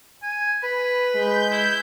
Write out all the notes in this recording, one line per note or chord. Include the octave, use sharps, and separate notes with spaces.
G#5
B4 B5
G#3 G6
E4